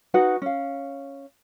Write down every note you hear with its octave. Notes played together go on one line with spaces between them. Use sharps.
D#4 F#4 B4 F#5
C#4 F5